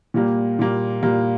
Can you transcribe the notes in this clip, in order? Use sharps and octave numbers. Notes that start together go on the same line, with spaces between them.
A#2 G3 A#3
A#2 G3 A#3
A#2 G3 A#3